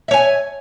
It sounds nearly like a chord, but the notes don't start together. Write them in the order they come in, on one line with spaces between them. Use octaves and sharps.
E5 C#5 G#5